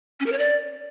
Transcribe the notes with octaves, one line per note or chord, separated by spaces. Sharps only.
C#4
A#4
C#5
D5